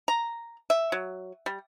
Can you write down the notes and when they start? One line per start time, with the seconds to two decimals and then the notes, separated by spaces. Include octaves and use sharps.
0.08 A#5
0.70 E5
0.92 F#3
1.46 G3